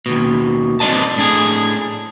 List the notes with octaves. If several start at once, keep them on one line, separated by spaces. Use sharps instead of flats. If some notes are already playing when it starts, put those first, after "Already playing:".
D#2 B2
G2 C4 D5 D#5 A5
A2 D4 G#4